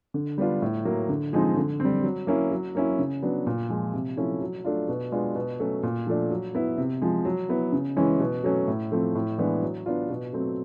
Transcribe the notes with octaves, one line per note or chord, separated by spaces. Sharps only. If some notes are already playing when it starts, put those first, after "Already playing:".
D3
G3 B3 D4 F4
A2
F#3 A#3
D3
F3 G#3 C4 D#4
D3
G3 C4
F#3
A#3 C#4 E4
F#3
A#3 C#4 E4
C#3
F#3 B3 D4
A#2
F3 G#3
C3
F3 A3 C#4 E4
F#3
A3 D4 F4
B2
G#3 B3 D4 F4
B2
F#3 A3 C#4
A#2
F3 A3 D4
F#3
B3 E4
C3
F3 G#3
F#3
B3 E4
C#3
E3 G#3 C#4 E4
B2
F#3 A3 C#4
A2
F3 A3 C4
A2
E3 G#3 B3 D4
F#3
B3 D4 F4
B2
F#3 A3 C4